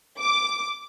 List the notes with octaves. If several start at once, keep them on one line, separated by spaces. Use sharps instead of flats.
D6